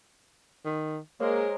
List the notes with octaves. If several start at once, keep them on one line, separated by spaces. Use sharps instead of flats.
D#3
G#3 A#3 G#4 A#4 C5 C#5